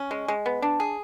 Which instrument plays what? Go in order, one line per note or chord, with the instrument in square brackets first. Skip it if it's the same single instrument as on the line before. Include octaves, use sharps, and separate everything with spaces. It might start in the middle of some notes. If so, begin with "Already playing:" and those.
Already playing: [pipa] C#4
G#3
G#3
B3
D4
G#4